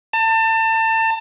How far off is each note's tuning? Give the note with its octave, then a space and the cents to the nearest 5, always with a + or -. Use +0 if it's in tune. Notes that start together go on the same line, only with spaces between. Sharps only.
A5 +30